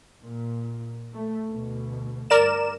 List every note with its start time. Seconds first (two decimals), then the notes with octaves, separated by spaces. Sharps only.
0.25 A#2
1.13 A3
1.45 D2 B2
2.30 G2 A#4 D5 E7